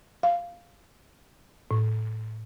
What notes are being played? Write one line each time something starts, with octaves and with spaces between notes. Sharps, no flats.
F5
A2